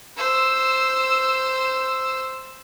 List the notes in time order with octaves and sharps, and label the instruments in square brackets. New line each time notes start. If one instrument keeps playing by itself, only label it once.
[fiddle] C5 E6